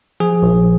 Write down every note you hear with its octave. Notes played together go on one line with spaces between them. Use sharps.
F3 G#4
A#1